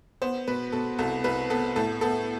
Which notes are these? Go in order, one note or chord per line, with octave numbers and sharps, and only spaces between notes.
B3 C5
B2 B4
B2 A4
C2 A4
C2 B4
B3 A4
A2 A4
B3 A4